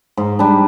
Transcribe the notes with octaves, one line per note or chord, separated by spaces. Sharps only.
G#2
G3 D4